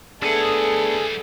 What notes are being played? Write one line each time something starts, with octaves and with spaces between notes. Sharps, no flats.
G3 A3 B3 D4 G#4 A4 F#5